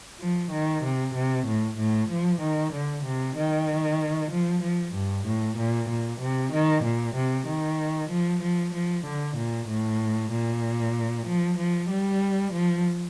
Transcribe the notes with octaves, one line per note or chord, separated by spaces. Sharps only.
F3
D#3
C3
C3
A2
A2
F3
D#3
D3
C3
D#3
F3
F3
G2
A2
A#2
A#2
C3
D#3
A#2
C3
D#3
F3
F3
F3
D3
A#2
A2
A#2
F3
F3
G3
F3